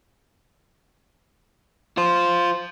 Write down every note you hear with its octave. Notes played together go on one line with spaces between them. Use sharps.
F4 C5